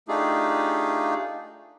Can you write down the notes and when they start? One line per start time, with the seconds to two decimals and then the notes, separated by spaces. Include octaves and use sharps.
0.08 A3 D4 D#4 F4 G4 G#4